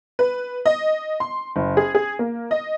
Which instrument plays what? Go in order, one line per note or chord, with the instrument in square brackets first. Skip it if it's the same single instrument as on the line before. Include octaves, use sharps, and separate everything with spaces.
[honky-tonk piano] B4
D#5
C6
F#1
G#4
G#4
A#3
D#5